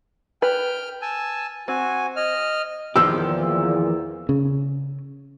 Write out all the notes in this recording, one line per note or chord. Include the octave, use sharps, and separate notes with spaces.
B4 G5 F6
G#5 A5 E6
C4 F#4 G#5
D#5 F6
E2 A#2 D#3 F3 G4 E6
C#3